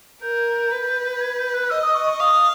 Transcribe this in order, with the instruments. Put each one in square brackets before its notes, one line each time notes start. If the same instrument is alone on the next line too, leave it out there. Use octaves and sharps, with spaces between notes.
[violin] A#4 [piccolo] G6
[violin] B4
[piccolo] G#6
G6
F#6
[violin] D#5 [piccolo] E6
[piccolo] D#6
C#6
C#6
[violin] F5 [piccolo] D#6